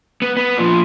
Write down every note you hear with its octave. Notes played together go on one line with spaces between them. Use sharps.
B3
B3
A#2 F3